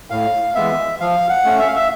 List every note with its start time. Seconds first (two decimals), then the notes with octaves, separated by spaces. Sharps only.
0.10 A2 F5
0.55 E3 G#3 B3 E5
1.00 F3 F5
1.29 F#5
1.44 A3 C#4
1.59 E5
1.67 F5
1.76 E5